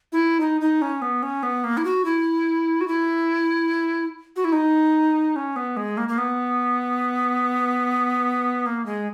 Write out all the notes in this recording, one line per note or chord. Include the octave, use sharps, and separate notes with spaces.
E4
D#4
D#4
C#4
B3
C#4
B3
A#3
E4
F#4
E4
F#4
E4
F#4
E4
D#4
C#4
B3
G#3
A#3
A#3
B3
A#3
G#3